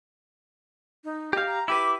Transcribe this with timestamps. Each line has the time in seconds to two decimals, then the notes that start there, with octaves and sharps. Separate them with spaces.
1.05 D#4
1.33 G4 D#5 F5
1.47 A#5
1.68 E4 G4 B4 D6